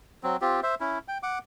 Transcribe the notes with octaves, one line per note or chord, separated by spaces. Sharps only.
F#3 C4
C4 F4 G4
C5 E5
C#4 E4
G5
F#5 D6